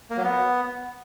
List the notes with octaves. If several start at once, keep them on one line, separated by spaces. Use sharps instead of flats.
A#3
F#3
B3